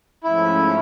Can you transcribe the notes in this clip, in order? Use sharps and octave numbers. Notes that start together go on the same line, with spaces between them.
G#2 F3 A3 C#4 E4